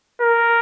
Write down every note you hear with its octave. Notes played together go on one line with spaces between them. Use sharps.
A#4